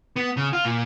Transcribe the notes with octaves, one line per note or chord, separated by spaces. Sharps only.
B3
C#3
F4
A#2